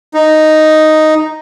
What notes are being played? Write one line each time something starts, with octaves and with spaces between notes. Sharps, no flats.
D#4